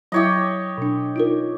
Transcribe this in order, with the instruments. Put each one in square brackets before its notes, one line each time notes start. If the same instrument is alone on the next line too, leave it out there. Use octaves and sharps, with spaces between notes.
[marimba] F#3 E4 E5 [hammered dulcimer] G4 C#5 D#5
[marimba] B2 D4
D#4 F4 A#4